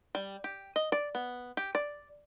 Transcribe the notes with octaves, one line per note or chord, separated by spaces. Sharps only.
G3
G4
D#5
D5
B3
G4
D5